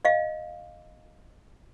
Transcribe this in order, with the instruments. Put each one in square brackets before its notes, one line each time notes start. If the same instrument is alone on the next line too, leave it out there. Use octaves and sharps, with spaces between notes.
[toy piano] D#5 F5